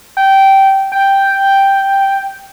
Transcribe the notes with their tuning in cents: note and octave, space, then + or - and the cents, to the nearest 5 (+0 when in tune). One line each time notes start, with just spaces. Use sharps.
G5 -15
G5 +0